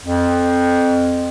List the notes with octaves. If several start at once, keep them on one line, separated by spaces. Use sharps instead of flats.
F2